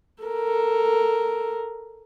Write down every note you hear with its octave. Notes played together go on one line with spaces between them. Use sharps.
A4 A#4